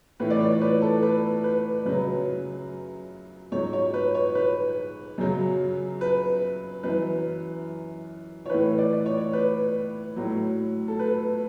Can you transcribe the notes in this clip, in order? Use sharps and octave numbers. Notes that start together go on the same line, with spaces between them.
A2 E3 B4
D5
C#5
B4
A4
B4
B4
F#2 C#3 F#3 B4
G#2 F#3 C#5
C#5
B4
C#5
B4
F#2 C#3 F#3
B4
F#2 E3 B4
C#5
A2 E3 B4
D5
C#5
B4
A2 F#3
A4
B4